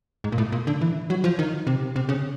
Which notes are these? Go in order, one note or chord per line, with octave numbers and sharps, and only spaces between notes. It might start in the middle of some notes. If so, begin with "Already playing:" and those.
G#2
A#2
A2
A#2
D3
E3
F#3
F3
D#3
C3
C3
C#3